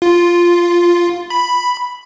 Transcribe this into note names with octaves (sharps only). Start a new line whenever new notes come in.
F4
B5